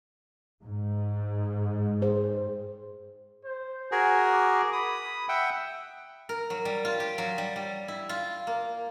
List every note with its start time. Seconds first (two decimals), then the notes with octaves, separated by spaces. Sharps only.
0.64 G#2
2.02 G#4 C5
3.45 C5
3.92 F#4 G#4 A#4 G#5
4.33 D6
4.73 B5 D#6
5.29 E5 F#5 G5
6.29 A#4
6.50 F#3
6.65 G3
6.85 F4
7.00 G4
7.18 F#3
7.38 G3
7.56 G3
7.88 E4
8.09 F4
8.47 A#3